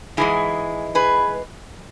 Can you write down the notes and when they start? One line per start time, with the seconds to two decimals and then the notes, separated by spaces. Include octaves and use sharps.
0.17 G#2 E3 G#3 E4 G#4
0.95 G#4 B4